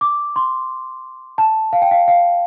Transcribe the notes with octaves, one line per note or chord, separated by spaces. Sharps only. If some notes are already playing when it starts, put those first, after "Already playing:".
D6
C6
A5
F5
G5
F5
F5